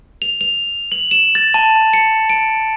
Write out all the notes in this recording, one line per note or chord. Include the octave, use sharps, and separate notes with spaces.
F7
F7
F#7
E7
A6
A5
C#7
D7